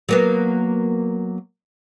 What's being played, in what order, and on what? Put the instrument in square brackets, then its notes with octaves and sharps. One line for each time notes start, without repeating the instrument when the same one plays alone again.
[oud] F#3 A#3 B3